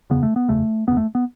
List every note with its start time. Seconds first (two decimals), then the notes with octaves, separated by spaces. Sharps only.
0.10 F#1 E2 C#3 B3
0.23 A3
0.36 B3
0.48 F#1 E2 C#3 A3
0.87 F#1 E2 C#3 B3
0.97 A3
1.15 B3